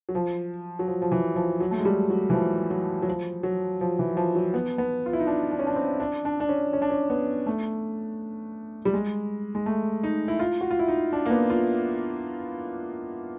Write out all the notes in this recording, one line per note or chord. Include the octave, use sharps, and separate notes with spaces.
F#3
F3
F#3
F3
F3
E3
F3
F#3
A3
G#3
G3
F#3
E3
F3
F#3
F#3
F3
F#3
F3
E3
F3
F#3
B3
B3
F4
E4
D#4
D4
D4
C#4
D4
C4
D4
D4
D4
C#4
C#4
D4
C#4
B3
A3
G3
G#3
G#3
A3
D#4
E4
F4
F#4
F4
E4
D#4
D4
A#3
B3
F4